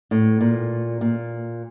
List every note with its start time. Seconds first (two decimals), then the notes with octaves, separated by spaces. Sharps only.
0.11 A2
0.41 A#2
1.01 A#2